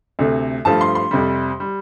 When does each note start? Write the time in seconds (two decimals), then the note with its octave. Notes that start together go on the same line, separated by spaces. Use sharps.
0.19 D2 C3 A3
0.65 G2 F3 A3 A5
0.81 C6
0.95 C6
1.11 F2 C3 G3
1.60 G3